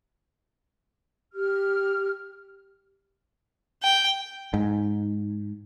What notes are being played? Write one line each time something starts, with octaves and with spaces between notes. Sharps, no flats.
G4 F6
G5
G#2